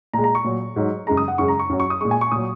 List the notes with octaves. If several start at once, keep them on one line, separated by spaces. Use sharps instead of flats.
A#2 G#3 A#5
A#5
C#6
A#2 F#3
G#2 F#3
F#2 C#3 G#3 A#5
D#6
F#5
F#2 C#3 G#3 C#6
A#5
C#6
F#2 F#3
C#6
D#6
A#2 G#3 C#6
G#5
C#6
A#2 F#3 D#6